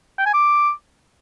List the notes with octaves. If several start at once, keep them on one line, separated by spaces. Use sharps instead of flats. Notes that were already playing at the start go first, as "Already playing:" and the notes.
G5
G#5
D6